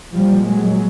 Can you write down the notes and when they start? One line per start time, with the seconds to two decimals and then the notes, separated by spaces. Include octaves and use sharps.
0.15 A#2 F3 G3
0.47 F#3 G#3